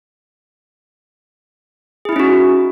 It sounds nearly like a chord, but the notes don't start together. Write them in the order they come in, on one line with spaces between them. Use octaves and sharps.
G#4 E4 D#4 C#4 F#4